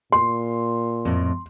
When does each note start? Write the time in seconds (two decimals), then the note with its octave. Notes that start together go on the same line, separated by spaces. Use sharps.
0.12 A#2 C6
1.05 F2 A2